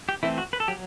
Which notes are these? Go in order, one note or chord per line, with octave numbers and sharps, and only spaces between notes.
G4
E3 A3 C4 E4
F#4
B4
A4
F#3 G4